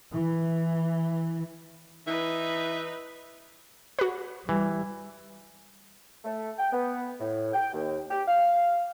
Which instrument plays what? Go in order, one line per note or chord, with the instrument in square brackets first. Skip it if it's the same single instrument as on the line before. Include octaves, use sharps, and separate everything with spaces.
[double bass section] E3
[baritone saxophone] E3 [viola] D#4 B4 [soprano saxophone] E5
[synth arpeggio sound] F#4 B4
[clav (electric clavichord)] E3 [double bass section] G3
[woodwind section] A3
G5
B3
A2
G5
D#2
G4
F5